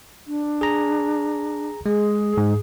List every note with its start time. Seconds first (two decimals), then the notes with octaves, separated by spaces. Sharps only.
0.27 D4
0.61 G#4 A#5
1.86 G#3 G#4
2.37 G#2